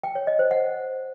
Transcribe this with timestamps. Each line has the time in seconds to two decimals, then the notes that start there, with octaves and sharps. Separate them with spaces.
0.03 G5
0.15 C#5
0.27 D#5
0.39 C5
0.51 F#5